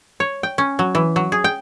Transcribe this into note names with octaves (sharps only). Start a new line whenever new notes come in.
C#5
G5
C#4
F#3
E3
F#3
G#4
G5